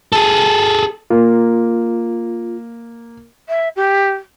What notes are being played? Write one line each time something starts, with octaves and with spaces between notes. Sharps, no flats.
G#4 A4
A#3 F4
E5
G4